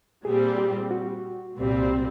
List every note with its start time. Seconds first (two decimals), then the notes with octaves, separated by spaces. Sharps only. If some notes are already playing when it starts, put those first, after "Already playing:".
0.25 A#2 G3 C4 G#4
0.58 G4
0.91 F#4
1.58 C2 A#2 G3 C4